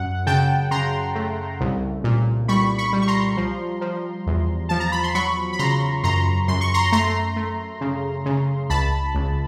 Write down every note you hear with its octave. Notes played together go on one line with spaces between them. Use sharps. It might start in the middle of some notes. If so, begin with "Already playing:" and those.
Already playing: F#2 F#5
C#3 G5 A5
C#3 A#5 C6
A3
C2
A#2
G3 B5 C#6
B5 C#6
G3
C#6
A#5 C6
F3
F3
E2
F3 A5
A#5
B5
C6
F#3 B5 C#6
B5
C#3 A#5 C6
F#2 A#5 C6
F#2 C6
C#6
A#5 C6
A3 A#5 C6
A3
C#3
C#3
C#2 A5 B5
C#2